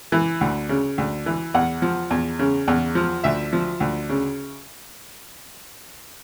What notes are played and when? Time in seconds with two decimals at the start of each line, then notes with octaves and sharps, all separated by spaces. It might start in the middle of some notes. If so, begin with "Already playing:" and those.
0.12 E3
0.41 D2
0.69 C#3
0.98 D2
1.26 E3
1.54 E2 F#5
1.82 F3
2.10 E2
2.39 C#3
2.68 E2
2.95 F3
3.24 D2 E5
3.53 F3
3.80 D2
4.09 C#3